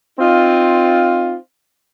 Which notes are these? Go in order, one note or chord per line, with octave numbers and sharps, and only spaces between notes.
C4 D#4 F4